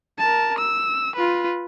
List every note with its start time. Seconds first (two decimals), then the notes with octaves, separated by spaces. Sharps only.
0.19 A#4 A5
0.59 E6
1.16 F4 B4